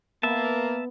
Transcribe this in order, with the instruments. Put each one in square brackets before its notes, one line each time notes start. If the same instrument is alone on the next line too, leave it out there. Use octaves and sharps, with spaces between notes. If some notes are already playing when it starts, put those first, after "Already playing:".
[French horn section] A#3 [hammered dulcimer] B3 [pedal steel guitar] E5 A5